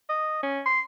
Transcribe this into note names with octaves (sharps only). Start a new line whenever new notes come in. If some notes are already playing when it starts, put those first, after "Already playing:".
D#5
C#4
C6